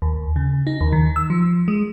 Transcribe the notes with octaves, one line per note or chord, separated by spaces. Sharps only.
D#2
C#3
D#4
D#2
D#3
E6
F3
G#3